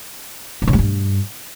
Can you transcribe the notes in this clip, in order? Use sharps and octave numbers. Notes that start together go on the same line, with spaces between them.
D3
C#3
G#3
G2